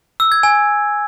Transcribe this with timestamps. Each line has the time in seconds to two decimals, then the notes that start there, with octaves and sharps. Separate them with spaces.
0.20 E6
0.32 G#6
0.43 G#5